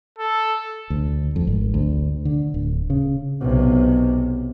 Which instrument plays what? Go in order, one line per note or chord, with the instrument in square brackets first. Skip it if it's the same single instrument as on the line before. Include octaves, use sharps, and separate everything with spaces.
[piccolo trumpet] A4
[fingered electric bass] D2
F2
G#1
D2
D3
D1
C#3
[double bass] B1 C3